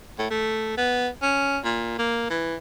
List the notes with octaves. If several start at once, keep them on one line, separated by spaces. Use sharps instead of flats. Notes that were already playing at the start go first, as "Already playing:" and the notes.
A2
A3
B3
C#4
A#2
A#3
E3